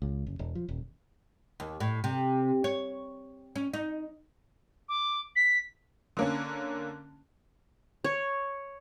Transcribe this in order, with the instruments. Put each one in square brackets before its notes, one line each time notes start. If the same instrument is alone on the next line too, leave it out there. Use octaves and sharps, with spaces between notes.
[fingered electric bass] C#2
F#1
E1
F3
D#1
[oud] D#2
A2
C3
C#5
C#4
D#4
[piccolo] D6
B6
[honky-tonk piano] D3 A#3 C#4
[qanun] C#5